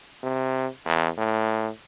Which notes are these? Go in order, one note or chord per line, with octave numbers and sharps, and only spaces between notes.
C3
E2
A2